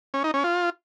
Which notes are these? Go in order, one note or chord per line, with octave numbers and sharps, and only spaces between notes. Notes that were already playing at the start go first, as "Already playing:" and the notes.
C#4
D#4
C#4
F4